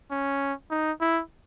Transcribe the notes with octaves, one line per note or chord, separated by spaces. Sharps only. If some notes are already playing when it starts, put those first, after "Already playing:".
C#4
D#4
E4